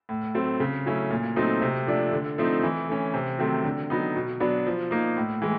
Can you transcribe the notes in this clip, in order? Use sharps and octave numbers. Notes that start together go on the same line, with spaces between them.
A2
F#3 A3 C4
C#3
F#3 A3 C#4 E4
A#2
F#3 A3 C4 D#4
C3
F3 A3 D4
D3
F3 A3 C4 D#4
E3
A3 C#4
C3
D#3 F#3 A3 C4
D3
F#3 B3 D#4
B2
F#3 B3 D4
F3
A#3 D#4
A2
E3 G#3